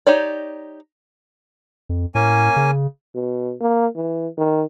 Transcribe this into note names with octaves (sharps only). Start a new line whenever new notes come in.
D#4 G4 C#5 D5
F2
A2 A#3 C#4 G#5
C#3
B2
A#3
E3
D#3